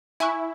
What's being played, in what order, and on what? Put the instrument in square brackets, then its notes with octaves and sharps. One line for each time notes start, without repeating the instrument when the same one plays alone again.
[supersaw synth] E4 [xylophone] E5 G#5 C#6 F#6